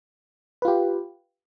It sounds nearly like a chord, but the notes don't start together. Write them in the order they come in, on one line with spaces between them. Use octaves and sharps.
B4 F4 G4